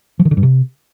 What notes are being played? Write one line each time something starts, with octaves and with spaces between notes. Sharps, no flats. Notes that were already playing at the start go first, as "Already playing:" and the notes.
F3
D#3
D3
G2
C3